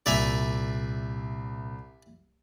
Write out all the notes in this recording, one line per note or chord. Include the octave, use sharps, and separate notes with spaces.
C2 A#2 D5 E5 G#5 F7